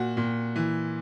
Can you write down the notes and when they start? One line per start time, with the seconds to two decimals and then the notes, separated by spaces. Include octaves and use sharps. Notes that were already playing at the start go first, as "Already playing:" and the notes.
Already playing: A#2 F#4
0.17 A#2
0.56 E3